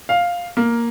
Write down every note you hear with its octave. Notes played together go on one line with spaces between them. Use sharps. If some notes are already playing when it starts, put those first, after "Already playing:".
F5
A#3